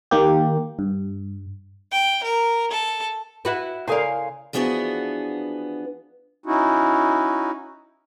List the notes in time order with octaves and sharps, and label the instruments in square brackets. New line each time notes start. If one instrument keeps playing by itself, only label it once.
[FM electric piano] D#3 A#3 G4
G2
[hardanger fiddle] G5
A#4
A4
[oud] E4 F#4 B4
[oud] C#3 A#4 [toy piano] E4 A4 D5 [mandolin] F5 G#5 C6
[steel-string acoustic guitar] E3 F3 B3 D4 F#4 G#4
[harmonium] C#4 D#4 E4 F#4